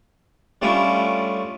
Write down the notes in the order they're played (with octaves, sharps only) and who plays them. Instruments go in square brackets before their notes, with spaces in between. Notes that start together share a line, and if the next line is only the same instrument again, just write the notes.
[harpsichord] G3 A3 C#4 D4 E4 F4